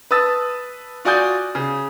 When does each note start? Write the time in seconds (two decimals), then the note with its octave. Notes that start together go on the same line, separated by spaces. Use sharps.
0.11 B4 A5 D#6 E6 A6
1.05 F4 F#4 D5 G#5 D#6 G6
1.55 C#3